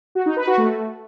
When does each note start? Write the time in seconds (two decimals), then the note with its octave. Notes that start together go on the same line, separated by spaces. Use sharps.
0.15 F#4
0.26 D#4
0.36 B4
0.47 F#4
0.58 A3